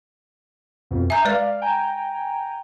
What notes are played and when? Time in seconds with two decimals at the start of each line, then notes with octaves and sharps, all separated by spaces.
0.91 F2 B2
1.10 E5 G#5 A#5 G6
1.25 G#3 B4 D5 F5
1.62 G5 G#5 A#5